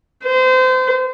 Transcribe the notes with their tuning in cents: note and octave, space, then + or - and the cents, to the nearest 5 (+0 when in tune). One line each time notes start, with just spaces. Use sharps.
C5 -30